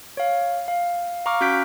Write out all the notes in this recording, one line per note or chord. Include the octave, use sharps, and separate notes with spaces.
C#5 F5
F5
F5 A#5 C#6 D6 F6
C#4 F#4 F#6 G6 B6 D7